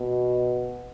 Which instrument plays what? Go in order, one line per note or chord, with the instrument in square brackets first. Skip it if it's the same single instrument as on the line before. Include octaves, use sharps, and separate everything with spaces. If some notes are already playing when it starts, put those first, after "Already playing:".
Already playing: [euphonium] B2